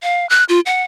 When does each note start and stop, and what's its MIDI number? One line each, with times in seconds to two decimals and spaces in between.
0.03 0.28 77
0.29 0.44 90
0.49 0.60 65
0.66 0.84 78